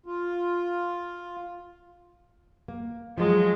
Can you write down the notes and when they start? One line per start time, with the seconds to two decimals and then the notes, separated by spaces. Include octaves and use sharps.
0.06 F4
2.68 A#3
3.18 F3 F#3 G#3 F4